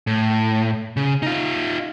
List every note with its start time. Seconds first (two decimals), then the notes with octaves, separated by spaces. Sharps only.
0.07 A2
0.97 C#3
1.22 D#4 F4